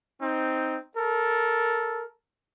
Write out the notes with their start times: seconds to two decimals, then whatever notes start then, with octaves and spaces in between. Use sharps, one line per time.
0.20 C4 D#4
0.96 A4 A#4